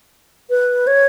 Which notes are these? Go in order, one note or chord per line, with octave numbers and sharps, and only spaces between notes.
B4
C#5